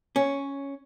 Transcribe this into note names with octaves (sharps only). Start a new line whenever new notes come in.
C#4